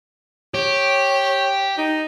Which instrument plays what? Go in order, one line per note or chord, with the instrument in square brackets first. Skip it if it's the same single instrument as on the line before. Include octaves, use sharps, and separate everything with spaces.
[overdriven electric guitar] G4 [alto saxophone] C#5
[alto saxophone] D#4